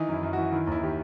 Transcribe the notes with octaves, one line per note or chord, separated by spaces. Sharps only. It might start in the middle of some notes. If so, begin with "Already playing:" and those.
Already playing: D#3 E3 D#4
F#2 E4
F#2
E3 F#4
D#3 E4
D#2 E4
D#3 G4